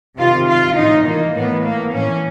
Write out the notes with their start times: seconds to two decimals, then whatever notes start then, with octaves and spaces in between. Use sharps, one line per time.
0.17 C3 D#3 F4
0.48 F4
0.76 A2 E3 D#4
1.06 A#3
1.36 A2 E3 B3
1.64 A#3
1.94 A2 E3 C#4